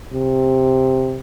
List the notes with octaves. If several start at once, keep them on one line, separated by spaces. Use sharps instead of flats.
C3